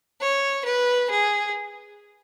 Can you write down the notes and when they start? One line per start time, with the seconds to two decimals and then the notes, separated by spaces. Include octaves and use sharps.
0.21 C#5
0.65 B4
1.10 G#4